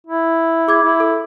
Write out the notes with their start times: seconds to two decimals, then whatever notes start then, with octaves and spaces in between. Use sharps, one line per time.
0.07 E4
0.68 G#4 D6 G#6
0.83 E4
1.00 A4